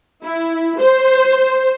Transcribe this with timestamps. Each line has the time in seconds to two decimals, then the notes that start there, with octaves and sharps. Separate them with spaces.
0.23 E4
0.80 C5